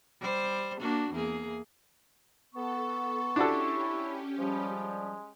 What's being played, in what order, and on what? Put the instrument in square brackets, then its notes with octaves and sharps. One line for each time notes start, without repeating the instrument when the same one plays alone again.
[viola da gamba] G3 C5
A#3 D4 F#4
E2 A#3 G#4
[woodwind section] B3 [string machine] A4 [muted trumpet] C#6
[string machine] C#4 G4 [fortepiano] D4 F#4 A4 [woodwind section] E4
[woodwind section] F3 G3 [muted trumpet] G#3